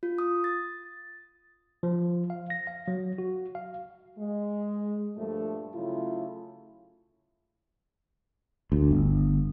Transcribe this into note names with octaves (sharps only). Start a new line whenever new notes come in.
F4
D#6
A6
F3
F5
A#6
F5
F#3
F#4
F5
G#3
G2 A#2 F3 A3
C#3 F#3 A3 E4 F4
D2
G1